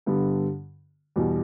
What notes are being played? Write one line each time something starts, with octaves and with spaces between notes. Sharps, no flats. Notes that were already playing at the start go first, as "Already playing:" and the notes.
G2 D3 G3 B3
E2 B2 G3